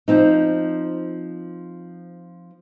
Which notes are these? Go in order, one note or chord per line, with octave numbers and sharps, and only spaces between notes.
F3 C4 D#4